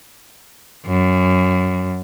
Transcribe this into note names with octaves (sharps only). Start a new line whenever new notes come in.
F#2